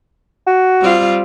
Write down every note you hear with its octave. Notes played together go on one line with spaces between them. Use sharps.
F#4
G3 C4 F4